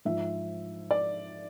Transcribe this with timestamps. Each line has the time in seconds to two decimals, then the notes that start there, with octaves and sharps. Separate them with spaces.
0.05 G#2 F3 E5
0.91 D5